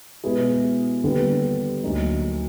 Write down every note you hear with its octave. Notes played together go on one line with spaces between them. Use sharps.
B2 G#3 B3 E4 G#4
D#2 D3 G3 B3 D4
D2 D3 F#3 A#3 D#4